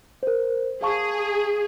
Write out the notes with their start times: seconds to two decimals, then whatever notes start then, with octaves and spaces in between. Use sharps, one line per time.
0.23 A#4 C5
0.82 G#4 F5 A5 C#6